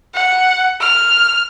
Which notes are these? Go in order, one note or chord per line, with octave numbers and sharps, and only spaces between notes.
F#5
F6